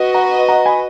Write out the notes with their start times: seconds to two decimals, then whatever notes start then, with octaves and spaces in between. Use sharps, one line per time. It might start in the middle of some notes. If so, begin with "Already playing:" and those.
Already playing: F#4 B4 D#5
0.14 F#5 A#5
0.49 F#5 A#5
0.66 G#5 B5